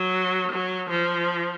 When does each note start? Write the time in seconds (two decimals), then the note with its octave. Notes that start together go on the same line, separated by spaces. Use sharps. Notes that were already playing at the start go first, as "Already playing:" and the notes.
Already playing: F#3
0.52 F#3
0.90 F3